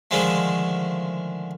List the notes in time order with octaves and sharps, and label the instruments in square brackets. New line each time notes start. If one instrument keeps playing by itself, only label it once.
[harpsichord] D3 D#3 F3 G#3 A3